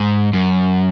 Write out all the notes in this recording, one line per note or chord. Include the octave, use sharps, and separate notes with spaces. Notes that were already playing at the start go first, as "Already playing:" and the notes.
Already playing: G#2
F#2